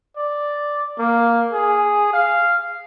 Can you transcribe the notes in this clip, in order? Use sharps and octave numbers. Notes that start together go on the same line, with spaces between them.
D5
A#3
G#4
F5